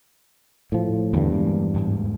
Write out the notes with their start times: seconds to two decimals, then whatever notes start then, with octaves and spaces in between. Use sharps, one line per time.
0.72 A2 F3
1.13 E2 G2 C#3 E3 F3
1.30 G#3 A#3
1.74 D2 G#2